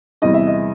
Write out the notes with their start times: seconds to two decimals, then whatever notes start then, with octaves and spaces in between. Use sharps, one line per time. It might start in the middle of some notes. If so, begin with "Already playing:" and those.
0.22 E2 C3 E3 G3 D#5
0.34 E5
0.47 D#5